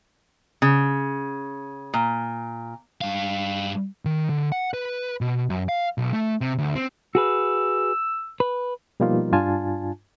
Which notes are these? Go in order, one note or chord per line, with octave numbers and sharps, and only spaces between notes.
C#3
A#2
G2 F5
D#3
D3
F#5
B4
B2
F#2
F5
B1
A3
C3
D2
C4
F#4 G#4 B4 E6
B4
B2 F3 G3 A#3 D#4 F4
G2 D4 F4 G#5 A5